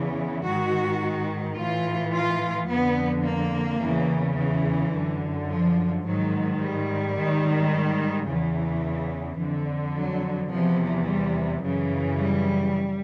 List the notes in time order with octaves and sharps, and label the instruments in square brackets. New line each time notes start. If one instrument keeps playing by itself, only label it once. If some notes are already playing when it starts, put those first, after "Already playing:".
Already playing: [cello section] E2 C#3 E3
G#2 D#3 F#4
A2 E3 F4
F4
F2 D3 B3
A#3
E2 C#3 E3
E3
F#2 D3
F3
G#2 D#3 F#3
G3
G#2 D#3
E2 C#3 E3
F2 D3
F#3
E2 C3 E3 F3
G3
F#2 C#3 E3
G3